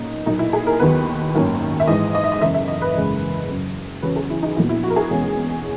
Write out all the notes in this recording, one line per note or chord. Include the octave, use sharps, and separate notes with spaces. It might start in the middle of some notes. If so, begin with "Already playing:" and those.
Already playing: B1 A#2 A#3 C#4 D#4
B1 A#2 A#3 D#4
E4
G#4
A#4
D#2 D#3 F#3 B3 B4
G#1 F#2 D#3 A#3 C#4
E5
G#2 E3 G#3 D#5
D#5
E5
D#5
F#1 E2 C#3 E5
E5
D#5
B4
F#1 E2 C#3 G#3
F#1 F#2 C#3
E2 C#3 F#3 C#4 B4
G#4
E4
D#4
A#1 A#2 F#3 B3 E4
E4
F#4
A#4
G#4
E2 B2 G#3 C#4